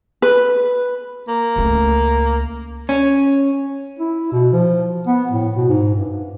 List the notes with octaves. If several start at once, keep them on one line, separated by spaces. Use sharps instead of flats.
B4
A#3
C#2 A3
C#4
E4
B2
F3
B3
A2
B2
G#2
G2